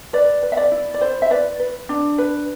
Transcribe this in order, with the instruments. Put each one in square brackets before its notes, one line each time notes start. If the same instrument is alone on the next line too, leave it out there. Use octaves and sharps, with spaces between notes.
[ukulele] B4 D5
B4
E5
D5
E4
D5
E4 C5
E5
B4 D5
B4
D4
B4